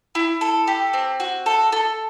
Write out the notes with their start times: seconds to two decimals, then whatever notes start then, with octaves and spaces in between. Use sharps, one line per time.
0.15 E4
0.41 A4
0.67 G4
0.93 C4
1.20 F#4
1.46 A4
1.72 A4